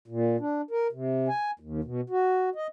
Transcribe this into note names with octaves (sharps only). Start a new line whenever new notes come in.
A#2
D4
A#4
C3
G#5
D#2
B2
F#4
D#5